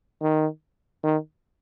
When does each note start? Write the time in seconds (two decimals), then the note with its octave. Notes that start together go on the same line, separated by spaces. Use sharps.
0.22 D#3
1.04 D#3